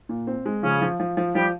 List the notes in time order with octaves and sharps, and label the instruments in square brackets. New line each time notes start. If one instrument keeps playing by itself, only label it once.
[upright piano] A#2
C4
G#3
[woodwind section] C#3 C#4 [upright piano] F3
[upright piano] F3
F3
F3
[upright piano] F3 [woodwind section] G3 G4